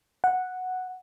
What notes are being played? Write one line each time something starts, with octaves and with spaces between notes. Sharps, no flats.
F#5